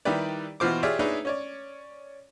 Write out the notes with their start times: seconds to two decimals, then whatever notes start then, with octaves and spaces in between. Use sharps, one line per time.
0.05 D#3 G3 E4 G4 B4 D5
0.60 B2 E3 F4 C5 D6
0.83 F4 G4 G#4 C#5 D5 E5
0.99 D4 D#4 G#4 B4 C#5 E5
1.25 C#4 C#5 D5